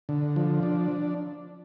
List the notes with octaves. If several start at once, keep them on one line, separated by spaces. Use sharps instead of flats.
D3
F3
D4